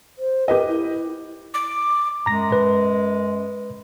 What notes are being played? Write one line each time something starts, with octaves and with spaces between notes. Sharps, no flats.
C5
G4 A#4 B4 D#5
E4
D6
F#2 G#3 A#5 A#6
B4